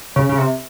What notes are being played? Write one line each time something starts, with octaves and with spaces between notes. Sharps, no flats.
C#3
C#3
C3